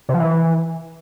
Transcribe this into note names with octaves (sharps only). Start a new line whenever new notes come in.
C3
F3
E3